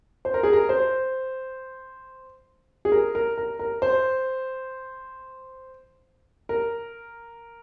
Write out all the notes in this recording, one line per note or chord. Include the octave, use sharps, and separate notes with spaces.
C5
A#4
G#4
A#4
C5
G#4
A#4
A#4
A#4
A#4
C5
A#4